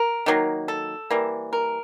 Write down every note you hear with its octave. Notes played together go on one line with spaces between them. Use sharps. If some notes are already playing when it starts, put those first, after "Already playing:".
Already playing: A#4
D#3 F#3 A#3
A4
E3 G3 A#3
A#4